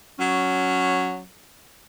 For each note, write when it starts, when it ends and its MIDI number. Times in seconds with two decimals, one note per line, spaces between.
0.18 1.21 54
0.18 1.21 61